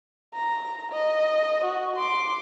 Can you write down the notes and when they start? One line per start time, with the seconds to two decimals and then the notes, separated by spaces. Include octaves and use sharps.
0.34 A#5
0.92 D#5
1.64 F#4
1.96 C6 D6